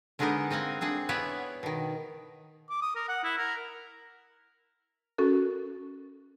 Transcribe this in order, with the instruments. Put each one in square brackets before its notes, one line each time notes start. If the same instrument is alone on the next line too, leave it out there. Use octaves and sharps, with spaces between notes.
[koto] D3 G#3 B3 D4 D#4 A#4
C4 D#5 F5 F#5 G#5
C4 D4 G#4 F#5
B3 E4 C#5 D5 E5 F#5
B2 D#3
[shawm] D6
D#6
A#4
F#5
E4
A#4
[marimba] C#4 F#4 A4 A#4